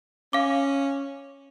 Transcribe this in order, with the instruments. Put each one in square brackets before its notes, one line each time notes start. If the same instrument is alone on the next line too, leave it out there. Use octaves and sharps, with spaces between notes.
[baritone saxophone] C#4 [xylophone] F5 D6